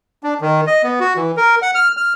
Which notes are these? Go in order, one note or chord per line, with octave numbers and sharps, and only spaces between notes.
D4
D#3
D#5
B3
F#4
E3
A#4
F#5
F6
F6